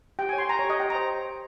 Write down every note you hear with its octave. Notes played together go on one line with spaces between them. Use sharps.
G4 G5
C#5 G#5
C6
C#5 A#5
C#5
G4
D#5
G4 G5
A#5
C5